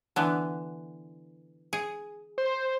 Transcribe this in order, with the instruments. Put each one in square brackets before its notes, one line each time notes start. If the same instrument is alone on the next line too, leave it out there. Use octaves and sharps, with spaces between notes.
[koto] D3 E3 B3
G#4
[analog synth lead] C5